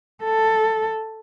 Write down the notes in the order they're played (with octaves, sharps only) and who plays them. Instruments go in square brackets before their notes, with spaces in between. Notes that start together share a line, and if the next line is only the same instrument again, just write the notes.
[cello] A4